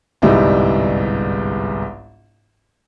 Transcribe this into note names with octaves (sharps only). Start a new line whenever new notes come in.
G1 C2 G#2 G3 G#3 E4